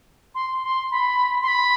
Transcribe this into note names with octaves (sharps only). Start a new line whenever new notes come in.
C6
C6
B5
C6
B5